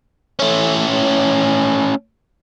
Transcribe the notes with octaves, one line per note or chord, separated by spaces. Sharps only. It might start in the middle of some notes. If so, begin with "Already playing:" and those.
A3 C#4